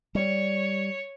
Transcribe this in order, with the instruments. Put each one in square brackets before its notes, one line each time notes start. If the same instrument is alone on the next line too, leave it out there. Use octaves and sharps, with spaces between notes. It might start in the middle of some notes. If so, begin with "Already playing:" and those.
[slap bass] G3 [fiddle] C#5